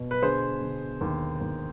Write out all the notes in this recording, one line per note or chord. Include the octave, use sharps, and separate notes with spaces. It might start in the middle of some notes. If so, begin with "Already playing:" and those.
Already playing: B2
B4
D3 G#4 C5
D3
D#2
D#2